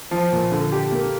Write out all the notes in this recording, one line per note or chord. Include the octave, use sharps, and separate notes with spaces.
F3
A#2
D3
G4
A#3